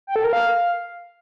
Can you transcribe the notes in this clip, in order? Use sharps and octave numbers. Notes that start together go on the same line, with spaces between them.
G5
A4
A#4
F5